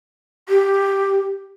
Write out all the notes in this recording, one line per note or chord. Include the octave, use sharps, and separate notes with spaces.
G4